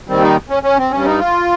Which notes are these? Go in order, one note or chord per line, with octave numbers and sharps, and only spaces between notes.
D#2 D#3 G3 C4
D#4
C#4
C#4
C4
G2 G3 C#4
D#4
F4